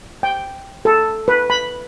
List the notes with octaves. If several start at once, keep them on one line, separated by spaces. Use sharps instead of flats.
G5
A4
B4
B5